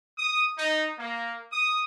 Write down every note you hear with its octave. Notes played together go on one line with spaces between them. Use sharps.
D#6
D#4
A#3
D#6